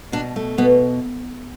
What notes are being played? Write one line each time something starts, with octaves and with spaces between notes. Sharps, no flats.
B2 D4
A3
B2 B3